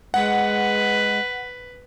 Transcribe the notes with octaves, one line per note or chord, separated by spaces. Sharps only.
G#3 B4 F#5